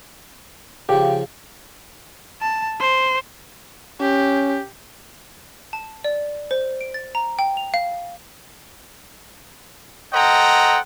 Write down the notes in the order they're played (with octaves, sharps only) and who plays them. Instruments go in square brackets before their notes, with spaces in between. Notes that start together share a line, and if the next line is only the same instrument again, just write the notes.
[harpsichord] C#3 F3 [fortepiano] G4
[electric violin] A5
C5
[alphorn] C#4 [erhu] G4
[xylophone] A5
D5
C5
D7
A6
A#5
G5
F7
F5
[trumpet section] A4 C5 D#5 F#5 G5 A#5